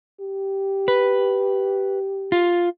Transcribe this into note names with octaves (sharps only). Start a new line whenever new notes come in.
G4
B4
F4